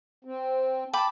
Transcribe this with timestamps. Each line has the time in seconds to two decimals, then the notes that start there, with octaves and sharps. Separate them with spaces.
0.25 C4
0.93 G5 A5 B5 D6